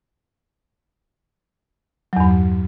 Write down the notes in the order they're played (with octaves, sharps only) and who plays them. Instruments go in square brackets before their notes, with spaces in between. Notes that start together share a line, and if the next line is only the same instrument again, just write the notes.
[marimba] F#3
E2
G2